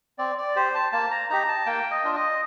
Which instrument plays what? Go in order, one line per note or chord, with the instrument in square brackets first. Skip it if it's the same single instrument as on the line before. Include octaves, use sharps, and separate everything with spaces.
[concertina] C4 D5
D5
G4 C5
A5
A#3 A5
A#5
D#4 G4 A#5
A5
A#3 G5
D#5
D4 F4
D#5